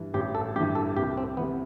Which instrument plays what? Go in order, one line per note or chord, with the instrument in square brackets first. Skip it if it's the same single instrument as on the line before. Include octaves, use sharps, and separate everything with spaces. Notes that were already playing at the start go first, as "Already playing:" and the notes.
Already playing: [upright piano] G2 E3
[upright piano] A1 [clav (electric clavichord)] G4
[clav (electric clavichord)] A4
[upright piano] G2 [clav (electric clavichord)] G4
[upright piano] E3
[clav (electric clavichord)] A4
[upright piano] C2 [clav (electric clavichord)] G4
[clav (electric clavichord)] C4
[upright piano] C3 E3 [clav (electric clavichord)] B3